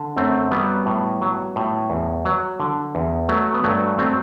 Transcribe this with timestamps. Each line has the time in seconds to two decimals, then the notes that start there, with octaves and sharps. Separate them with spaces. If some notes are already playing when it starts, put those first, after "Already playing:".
Already playing: D3
0.16 F#2 A3 C4
0.51 F#3 G3 B3
0.86 A2
1.21 F#3
1.56 A2
1.90 E2
2.25 F#3
2.60 D3
2.95 E2
3.29 F#3 A3
3.54 B3
3.64 G2 F#3 A3
3.98 F#3 A3 C4